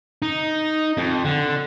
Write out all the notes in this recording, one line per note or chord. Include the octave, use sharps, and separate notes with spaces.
D#4
F2
D3